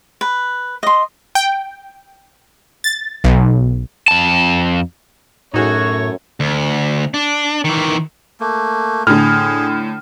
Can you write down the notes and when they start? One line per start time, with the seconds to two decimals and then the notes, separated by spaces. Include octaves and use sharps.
0.21 B4
0.83 D#5 C6
1.35 G5
2.84 A6
3.24 B1
4.08 F2 A5
5.54 F#2 A2 A3 D#4 F#4 G#4 C#5
6.40 D2
7.14 D4
7.65 D#3 E3
8.40 A3 A#3
9.07 A2 D3 G#4 F6